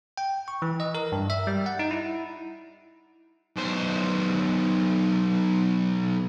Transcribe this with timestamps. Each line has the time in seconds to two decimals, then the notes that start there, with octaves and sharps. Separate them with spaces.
0.17 G5
0.48 C#6
0.62 E3
0.80 D#5
0.95 A#4
1.12 G2
1.30 E5
1.47 G3
1.66 F#5
1.79 D#4
1.91 E4
3.56 B1 C5